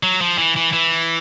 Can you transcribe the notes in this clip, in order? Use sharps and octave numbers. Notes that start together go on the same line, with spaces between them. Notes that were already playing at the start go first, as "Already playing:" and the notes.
F#3
F3
E3
E3
E3